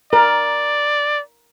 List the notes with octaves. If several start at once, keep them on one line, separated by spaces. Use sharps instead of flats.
A#4 D5